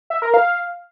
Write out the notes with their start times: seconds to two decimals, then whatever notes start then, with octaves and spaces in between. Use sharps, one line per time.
0.10 E5
0.22 A#4
0.34 F5